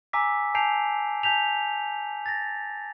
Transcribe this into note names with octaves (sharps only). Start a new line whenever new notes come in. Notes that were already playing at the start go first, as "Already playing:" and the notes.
G#5 A#5 D6 E6 B6
G#5 A5 G6 C7 D7 F7
G#5 A5 G6 B6 F7
A6 A#6